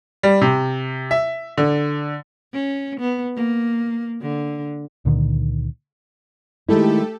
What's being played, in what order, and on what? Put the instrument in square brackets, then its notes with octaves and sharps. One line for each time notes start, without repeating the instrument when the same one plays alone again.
[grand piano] G3
C3
E5
D3
[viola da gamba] C#4
B3
A#3
D3
[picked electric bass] C#2 A#2 D3 D#3
[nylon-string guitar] D#3 G#3 E4 [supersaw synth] A3 G4 A4